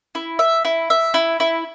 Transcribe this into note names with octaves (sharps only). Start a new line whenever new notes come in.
E4
E5
E4
E5
E4
E4